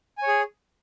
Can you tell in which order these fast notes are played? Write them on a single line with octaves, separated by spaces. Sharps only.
G#5 C#5 G#4